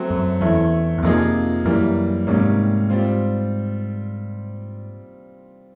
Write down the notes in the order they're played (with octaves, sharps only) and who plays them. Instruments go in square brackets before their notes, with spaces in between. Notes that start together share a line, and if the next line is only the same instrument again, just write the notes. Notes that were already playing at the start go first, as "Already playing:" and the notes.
Already playing: [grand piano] F#3 A3 C4
[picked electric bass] F#2
[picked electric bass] E2 [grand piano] A3 C#4 E4
[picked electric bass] E2
[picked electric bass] F2 [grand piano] C3 F3 A#3 D#4 G#4
[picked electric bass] F#2 [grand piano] E3 G3 A#3
[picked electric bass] G#2 [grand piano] C3 D#3 G3 A#3 C#4
[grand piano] G3 C4 F4